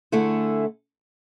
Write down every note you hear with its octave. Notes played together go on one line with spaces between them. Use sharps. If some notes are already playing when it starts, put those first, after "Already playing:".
D3 A3 E4 G#4